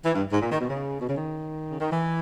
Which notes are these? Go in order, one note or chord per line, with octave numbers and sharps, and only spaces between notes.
E3
G2
G#2
A#2
D#3
B2
C#3
B2
C#3
D#3
C#3
D#3
E3